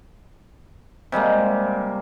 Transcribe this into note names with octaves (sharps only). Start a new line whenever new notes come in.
C3 G3 G#3 A#3